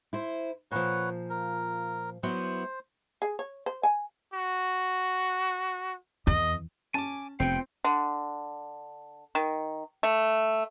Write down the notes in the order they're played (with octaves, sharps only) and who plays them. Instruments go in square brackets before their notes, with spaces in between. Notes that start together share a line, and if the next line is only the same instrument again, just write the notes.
[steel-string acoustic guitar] E4 C5
[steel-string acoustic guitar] A#2 F3 [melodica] B4 C#5 F#5
[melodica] A#4
[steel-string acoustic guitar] F#3 B3 E4 [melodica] C5
[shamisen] G#4
C#5
C5
G#5
[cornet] F#4
[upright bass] E2 [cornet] D#5
[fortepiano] C#4 A5 [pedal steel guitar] G#5 D6
[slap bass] F1 C3 [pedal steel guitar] B3 F4 [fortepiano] C4 [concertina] G5
[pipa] D3
D#3
A3